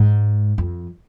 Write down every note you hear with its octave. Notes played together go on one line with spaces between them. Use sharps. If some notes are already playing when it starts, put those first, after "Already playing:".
Already playing: G#2
F2